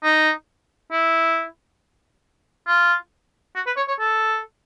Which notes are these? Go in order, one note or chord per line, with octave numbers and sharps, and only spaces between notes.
D#4
E4
F4
F#4
B4
C#5
C#5
A4